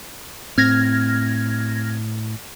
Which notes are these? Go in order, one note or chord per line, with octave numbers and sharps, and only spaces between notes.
A2 C4 F6 G#6 A#6